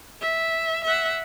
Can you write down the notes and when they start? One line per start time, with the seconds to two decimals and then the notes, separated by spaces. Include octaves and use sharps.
0.21 E5
0.84 E5 F#5